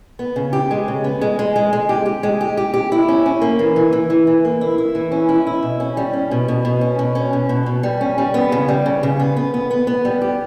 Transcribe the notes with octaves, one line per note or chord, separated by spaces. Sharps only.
B3
C#3
G4
G#3
C#3
B3
G#3
G#3
G#3
G#3
G4
G4
G#3
G4
G4
G4
E4
C#4
C#4
A#3
E3
E3
E3
E3
E3
A#3
E4
E4
E3
C#4
E4
E4
B2
C#4
G3
C#4
B2
B2
B2
C#4
B2
C#4
B2
B2
B2
G3
C#4
G3
B3
C#3
G3
C#3
C#3
B3
B3
B3
B3
B3
G3
G4